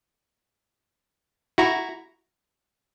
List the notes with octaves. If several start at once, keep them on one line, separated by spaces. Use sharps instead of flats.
E4 F#4 A#5